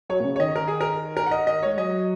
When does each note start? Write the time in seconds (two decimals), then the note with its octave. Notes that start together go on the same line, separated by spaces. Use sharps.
0.09 F#3 C#5
0.20 A#2
0.24 C#3
0.36 C#5
0.40 D#3 D#5
0.56 A#4
0.68 G#4
0.81 A#4
1.17 A#4
1.27 F#5
1.31 D#5
1.47 D#5
1.63 G#3 C#5
1.78 F#3 D#5